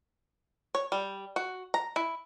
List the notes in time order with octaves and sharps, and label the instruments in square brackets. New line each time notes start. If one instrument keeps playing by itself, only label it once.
[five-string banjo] C#5
G3
F#4
A#5
E4